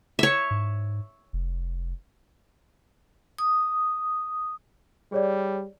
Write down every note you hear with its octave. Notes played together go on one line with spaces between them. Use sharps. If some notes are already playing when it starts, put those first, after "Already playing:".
C#5 E5
G#2
F1
D#6
G3 G#4 C#5 D5